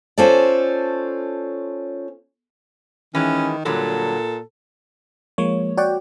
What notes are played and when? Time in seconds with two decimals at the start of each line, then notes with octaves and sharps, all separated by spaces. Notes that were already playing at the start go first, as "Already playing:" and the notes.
0.18 C#4 F4 A4 C5 D5
3.15 D#3 E3 G#3 C#4
3.65 A#2 D3 F#3 G3 A4
5.38 F3 G#3 A#3 C#5
5.77 F#4 C#5 D5 F#5 G5